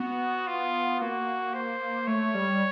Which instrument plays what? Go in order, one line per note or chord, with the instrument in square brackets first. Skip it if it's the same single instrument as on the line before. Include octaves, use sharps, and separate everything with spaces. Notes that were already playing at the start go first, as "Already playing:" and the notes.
Already playing: [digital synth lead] B3 [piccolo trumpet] F#4
[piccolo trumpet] F4
[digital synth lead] A#3 [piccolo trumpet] F#4
[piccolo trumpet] C5
[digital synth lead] A3 [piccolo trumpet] C#5
[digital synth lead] G3